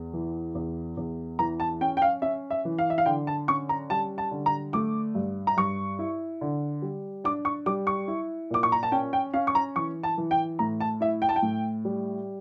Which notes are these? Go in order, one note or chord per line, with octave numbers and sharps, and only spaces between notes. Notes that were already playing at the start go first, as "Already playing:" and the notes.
Already playing: E2
E3
E2
E2
E3 A#5
A5
C#4 G5
G5
F5
C#4 E5
E5
E3
F5
E5
F5
D3 G5
A5
C#4 C#6
A#5
G3 A5
A5
D3
A#5
A3 D6
G2
A#5
G2 C#6
E4
D3
G3
D4 D6
C#6
G3 D6
C#6
E4
A#2 D6
C#6
A#5
A5
C#4 G5
G5
C#4 F5
C#6
A#5
E3 C#6
A5
E3
G5
A2 A#5
A5
E4 E5
G5
A5
G5
A2
G3